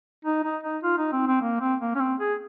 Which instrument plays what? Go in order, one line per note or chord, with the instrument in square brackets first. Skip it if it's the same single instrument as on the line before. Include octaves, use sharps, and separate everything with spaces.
[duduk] D#4
D#4
D#4
F4
D#4
C4
C4
A#3
C4
A#3
C#4
C4
G#4